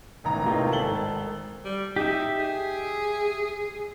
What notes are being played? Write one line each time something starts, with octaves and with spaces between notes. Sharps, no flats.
E1 A1 D#3 A#5
A2 C3 A#3 B3 D#4 F4
G#1 A4 A5 F#7 G7
G3
D#4 G4 E5
G#4